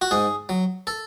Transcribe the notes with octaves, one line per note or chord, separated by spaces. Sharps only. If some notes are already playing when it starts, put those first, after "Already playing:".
F#4
G#2 G#4
F#3
A4